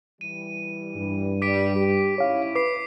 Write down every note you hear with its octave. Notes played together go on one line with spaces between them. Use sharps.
E3 G3 D#7
G2
G3 D6 B6 D7
G4
G#2 C#4 E4 C#5 F5
B4 D6 C7